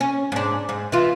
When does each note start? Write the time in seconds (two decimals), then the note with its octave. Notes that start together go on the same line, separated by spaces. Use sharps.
0.01 C#4
0.32 G#2 D4
0.69 G#2
0.92 E3 F4